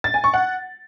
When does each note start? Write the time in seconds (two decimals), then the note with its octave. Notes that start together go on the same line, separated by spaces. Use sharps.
0.04 A6
0.14 G#5
0.24 C#6
0.34 F#5